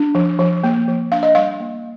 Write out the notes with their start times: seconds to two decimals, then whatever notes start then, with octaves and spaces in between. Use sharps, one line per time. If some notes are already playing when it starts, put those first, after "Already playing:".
Already playing: D4
0.15 F3
0.39 F3
0.64 A#3
0.88 F3
1.12 D4 F5
1.23 D#5
1.35 G3 F5
1.60 A#3